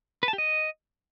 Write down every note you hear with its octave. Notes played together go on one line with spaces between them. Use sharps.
B4
A5
G4
D#5